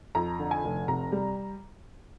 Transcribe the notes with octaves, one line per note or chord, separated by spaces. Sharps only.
F2 A#5
D3
G#5
F1
C3 A#5
G3